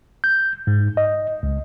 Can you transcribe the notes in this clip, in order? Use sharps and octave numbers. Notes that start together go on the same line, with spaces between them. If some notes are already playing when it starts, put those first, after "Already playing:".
G6
G#2
D#5
C#2